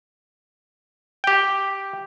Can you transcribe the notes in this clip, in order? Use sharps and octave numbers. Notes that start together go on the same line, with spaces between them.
G4 G5